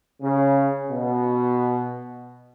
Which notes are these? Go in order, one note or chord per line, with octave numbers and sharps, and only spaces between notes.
C#3
B2